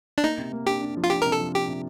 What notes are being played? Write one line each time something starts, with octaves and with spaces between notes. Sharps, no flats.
D4
A#3 D#4
C3
A#3
D4 G4
D4
F3
F4
D4 G4
C3 A#4
A4
F3
D4 G4
C3